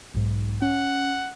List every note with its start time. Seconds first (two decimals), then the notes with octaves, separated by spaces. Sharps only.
0.14 B1 G#2
0.62 C#4 F#5